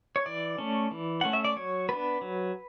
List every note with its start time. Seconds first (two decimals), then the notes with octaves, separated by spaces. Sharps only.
0.16 C#5
0.26 E3 D5
0.58 A3 C#4
0.91 E3
1.21 A3 C#4 F#5
1.33 E5
1.45 D5
1.56 F#3 C#5
1.89 B3 D4 B4
2.21 F#3